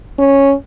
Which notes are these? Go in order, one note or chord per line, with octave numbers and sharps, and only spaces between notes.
C#4